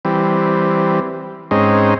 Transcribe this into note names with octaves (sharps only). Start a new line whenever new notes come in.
E3 G3 C4
G#2 G#3 C4 C#4 D#4